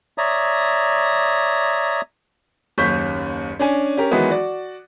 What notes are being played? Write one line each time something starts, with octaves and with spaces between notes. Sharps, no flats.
C#5 D5 E5 A#5 D#6
F#1 D#2 C#4 C#6 G6 B6
C#4 D4 G#5
C#4 G4 A#4
D#3 E3 F#3 G#3 B3 E4
F#4 D5